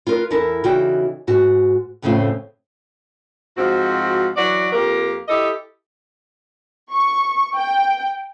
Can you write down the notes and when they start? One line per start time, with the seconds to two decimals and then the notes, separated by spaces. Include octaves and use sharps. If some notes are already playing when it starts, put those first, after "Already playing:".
0.07 F4 A#4 B4
0.30 E2 E4 A4 A#4 A5
0.64 C#3 E3 D#4 F#4 D5 G5
1.27 G#2 F#4
2.02 F2 A2 C#3 A3 C4 F4
3.57 G#2 F3 C4 F#4
4.36 E3 F#3 F#4 D5
4.72 F2 A#3 G4 A#4
5.29 E4 G4 A4 D#5
6.92 C#6
7.55 G5